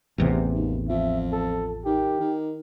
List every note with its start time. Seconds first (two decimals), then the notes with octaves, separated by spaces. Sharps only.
0.18 A1 E2 C3
0.54 D#2
0.89 F2 E5
1.32 A4
1.85 D#3 G4
2.20 D#3